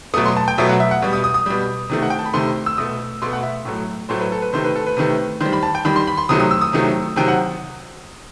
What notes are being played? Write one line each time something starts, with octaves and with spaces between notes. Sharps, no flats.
B2 F#3 A3 D#6
C6
A5
G5
B2 F#3 A3 E5
F#5
E5
F#5
B2 G3
D#6
D#6
D#6
B2 G3
C3 D#3 A3
F#5
G5
A5
B5
C3 D#3 A3 C6
E6
B2 A3 D#6
B2 A3 C6
F#5
E5
A2 F#3 A3
A2 F#3 A3 C5
B4
A4
B4
C3 D#3 A3 C5
B4
A4
B4
C3 D#3 A3
D#3 G3 C5
B5
A5
G5
D#3 G3 B5
C6
B5
C6
C3 D#3 F#3 A3 D#6
D#6
E6
D#6
C3 D#3 F#3 A3
C3 D#3 F#3 G5
F#5